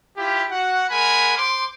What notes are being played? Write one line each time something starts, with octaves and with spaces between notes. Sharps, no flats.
E4 F4 G4
F#4 F#5
G#3 A#4 F#5 G#5 B5
C5 C6 D6